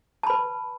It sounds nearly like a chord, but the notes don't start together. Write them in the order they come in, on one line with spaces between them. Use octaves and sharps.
A5 B5 B4